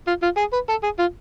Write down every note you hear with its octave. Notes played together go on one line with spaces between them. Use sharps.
F4
F4
G#4
B4
A4
G#4
F4